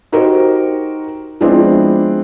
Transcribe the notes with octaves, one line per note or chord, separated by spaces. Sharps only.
D#4 F#4 G4 A#4 C5
F3 G#3 B3 C4 D4 E4